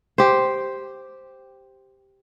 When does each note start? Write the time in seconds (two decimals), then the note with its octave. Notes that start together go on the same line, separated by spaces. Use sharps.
0.18 G4 C5